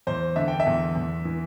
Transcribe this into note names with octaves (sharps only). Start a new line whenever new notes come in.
E2 C5
D3 E5
G5
E5
E2
E2
E3